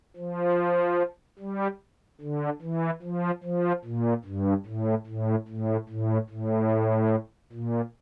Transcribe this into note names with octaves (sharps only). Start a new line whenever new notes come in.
F3
G3
D3
E3
F3
F3
A#2
G2
A2
A2
A2
A2
A2
A#2